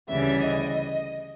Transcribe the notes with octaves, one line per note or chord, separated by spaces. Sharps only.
D2 C#3 E3 G3 E5
D#5